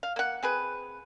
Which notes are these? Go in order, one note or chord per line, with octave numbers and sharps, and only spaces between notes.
F5
A#3 F#5
C4 G#4 B4